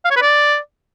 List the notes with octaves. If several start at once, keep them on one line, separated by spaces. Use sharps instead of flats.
F5
C#5
B4
D5